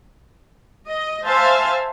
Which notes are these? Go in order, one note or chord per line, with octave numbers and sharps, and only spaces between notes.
D#5
C5 E5 F5 G#5 A5